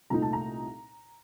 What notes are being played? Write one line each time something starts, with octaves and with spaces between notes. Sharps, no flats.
C2 A#2 A3 D#4 A#5
A5
A#5